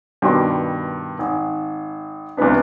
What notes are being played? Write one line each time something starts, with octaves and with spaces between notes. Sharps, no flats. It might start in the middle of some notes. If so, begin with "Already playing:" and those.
G2 B2 D#3 C#5 C6 D6
G#1
C#2 C3 E3 B3 D4